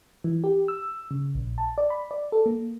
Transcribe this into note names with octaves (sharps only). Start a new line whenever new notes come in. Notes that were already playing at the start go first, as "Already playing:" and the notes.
E3
G4
E6
C#3
A#1
A5
D5
B5
D5
A4
A#3